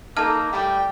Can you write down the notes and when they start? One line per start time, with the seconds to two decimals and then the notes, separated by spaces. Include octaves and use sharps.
0.17 A#3 D#4 A4 A5 F6
0.53 A2 G3 G5